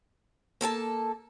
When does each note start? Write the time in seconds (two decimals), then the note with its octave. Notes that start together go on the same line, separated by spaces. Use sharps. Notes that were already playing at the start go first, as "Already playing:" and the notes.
0.61 A#3 A4 G#5 A5